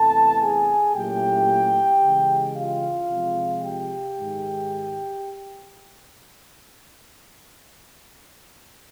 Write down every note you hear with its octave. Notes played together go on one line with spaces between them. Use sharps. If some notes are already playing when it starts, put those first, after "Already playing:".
Already playing: E2 C3 E3 A3 A4 A5
G#4 G#5
A#2 F#3 A3 C#4 E4 G4 G5
C#3 E3 G#3
F4 F5
C3 F3 G#3
G4 G5
G#2 D#3 G#3